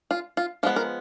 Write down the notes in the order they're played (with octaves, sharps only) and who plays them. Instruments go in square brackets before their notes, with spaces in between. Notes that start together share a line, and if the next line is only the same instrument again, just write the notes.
[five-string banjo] F4
F4
F3 G#3 B3 F4
A#4